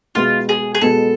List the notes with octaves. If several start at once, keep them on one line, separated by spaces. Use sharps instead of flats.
B2 G#3 B3 F4
G#4
G#4
B2 G#3 B3 A4